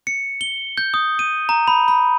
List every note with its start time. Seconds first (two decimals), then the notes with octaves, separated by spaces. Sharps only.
0.07 C#7
0.41 G7
0.78 G6
0.94 D#6
1.19 D#7
1.49 A#5
1.68 B5
1.88 B5